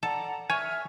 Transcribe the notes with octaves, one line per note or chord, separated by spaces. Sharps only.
A4 D5 F#5 A#5
C#5 E5 G#5 F6